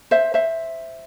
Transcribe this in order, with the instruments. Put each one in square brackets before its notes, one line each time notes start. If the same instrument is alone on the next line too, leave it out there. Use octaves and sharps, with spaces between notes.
[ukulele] C5 E5
C5 E5